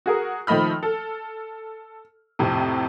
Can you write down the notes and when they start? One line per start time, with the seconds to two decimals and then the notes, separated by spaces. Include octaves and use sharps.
0.06 F#4 G#4 A#4
0.47 D#3 F3 A3 D#5 B5 F6
0.83 A4
2.39 F2 A2 C3